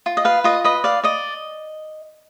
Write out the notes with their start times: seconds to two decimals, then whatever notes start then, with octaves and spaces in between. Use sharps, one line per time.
0.06 F4
0.17 D#5
0.25 B4 F5
0.44 F4 D#5
0.64 B4 D#5
0.84 D5 F5
1.03 D5 D#5